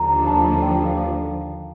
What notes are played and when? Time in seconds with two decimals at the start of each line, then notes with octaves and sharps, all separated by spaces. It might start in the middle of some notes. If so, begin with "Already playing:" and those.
Already playing: D#2 D3 F3 A#5
0.27 A5
0.62 G5
0.85 F5